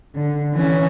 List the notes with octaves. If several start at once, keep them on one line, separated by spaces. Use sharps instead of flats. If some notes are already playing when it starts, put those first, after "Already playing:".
D3
E3 C#4